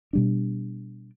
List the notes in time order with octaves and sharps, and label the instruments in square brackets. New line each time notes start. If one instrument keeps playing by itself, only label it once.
[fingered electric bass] B2 G3 D4